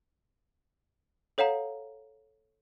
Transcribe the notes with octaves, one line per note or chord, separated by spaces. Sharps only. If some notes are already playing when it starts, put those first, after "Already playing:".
A4 C#5 F5 F#5 A#5